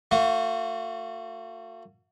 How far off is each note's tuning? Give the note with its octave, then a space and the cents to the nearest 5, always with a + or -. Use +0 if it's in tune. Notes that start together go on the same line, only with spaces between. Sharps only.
A3 +45 F#4 -35